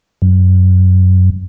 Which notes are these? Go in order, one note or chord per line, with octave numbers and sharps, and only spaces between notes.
F#2